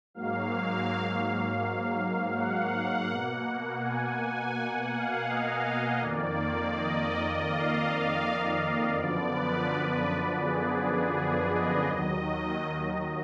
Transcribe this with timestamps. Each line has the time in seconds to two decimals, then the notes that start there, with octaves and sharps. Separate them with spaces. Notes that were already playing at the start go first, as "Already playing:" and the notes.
0.14 G#2 F#3 A#3 F5
2.34 F#5
3.08 B2 A#3
3.81 G#5
4.54 F#5
4.91 F5
5.27 D#5
6.01 F2 D#3 A#3 D5
6.38 D5
6.74 D#5
7.11 D#5
7.47 F5
8.94 F#2 D3 F3 B3 D5
9.30 B4
10.40 G#4
10.77 G#4
11.13 G#4
11.50 D#5
11.87 D#2 D#3 F#3 D#5